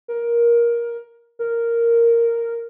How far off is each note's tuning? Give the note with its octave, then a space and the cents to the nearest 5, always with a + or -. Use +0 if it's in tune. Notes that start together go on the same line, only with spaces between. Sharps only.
A#4 +15
A#4 -5